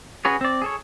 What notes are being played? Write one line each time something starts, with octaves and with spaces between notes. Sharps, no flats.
C#4 F#4 G#4 B4 C#5
C4 D5
G#4 A4 C#5